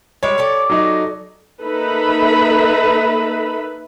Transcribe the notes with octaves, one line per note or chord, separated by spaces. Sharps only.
G3 G#3 G4 C#5
G4 A4 D5
F#3 D#4
A#3 D#4 A4 B4 E5 B5